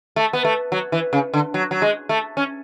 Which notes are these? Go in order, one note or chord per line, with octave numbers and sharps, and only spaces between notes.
A3
B3
A3
F#3
E3
C#3
D3
F#3
F#3
G#3
A3
C#4